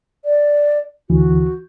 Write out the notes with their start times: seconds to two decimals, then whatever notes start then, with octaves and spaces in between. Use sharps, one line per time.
0.25 D5
1.10 D2 E3 F#4